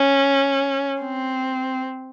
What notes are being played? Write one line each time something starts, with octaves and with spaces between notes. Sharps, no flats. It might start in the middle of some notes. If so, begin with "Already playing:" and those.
Already playing: C#4
C4